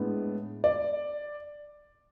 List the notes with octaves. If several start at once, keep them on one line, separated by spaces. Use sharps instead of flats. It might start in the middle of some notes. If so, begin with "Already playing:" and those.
Already playing: A2 G#3 B3 D4
D5